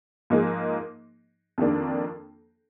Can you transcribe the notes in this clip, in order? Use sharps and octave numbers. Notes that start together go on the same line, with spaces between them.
G#2 F3 A#3 D#4 G#4
F2 D#3 A#3 D4